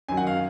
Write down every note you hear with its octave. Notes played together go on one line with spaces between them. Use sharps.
F#2 D#3 F#3 G#5
F#5
F5